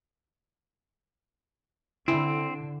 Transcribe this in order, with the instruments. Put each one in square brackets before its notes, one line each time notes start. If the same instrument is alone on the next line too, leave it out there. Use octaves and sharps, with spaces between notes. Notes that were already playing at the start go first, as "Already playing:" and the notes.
[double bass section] D3 [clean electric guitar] C4 [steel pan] E4